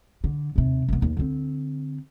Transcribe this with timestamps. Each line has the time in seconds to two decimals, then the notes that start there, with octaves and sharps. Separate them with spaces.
0.24 D3
0.56 D#2 C3
0.88 C2 B3
1.02 D#2
1.17 D3 C4